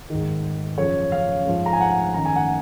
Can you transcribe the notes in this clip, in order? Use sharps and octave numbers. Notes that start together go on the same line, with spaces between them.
G#2 D#3
F#2 C#3 F3 C#5
F5
G#2 F3
A#5
G#5
F#5
F#2 D#3 A#5
G#5
F#5